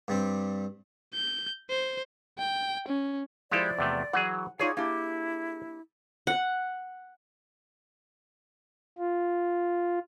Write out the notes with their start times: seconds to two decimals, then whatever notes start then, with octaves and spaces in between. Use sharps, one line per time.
0.08 G2 G3 C4
1.14 G6
1.69 C5
2.39 G5
2.88 C#4
3.51 F3 G#3 E4 G4 A4 C5 D5
3.79 E2 C3 A3
4.13 E3 F#3 G#4 F#5
4.59 D#4 F4 G#4 C#5 D5
4.77 A#3 D4 E4 G4
6.27 F#5
8.98 F4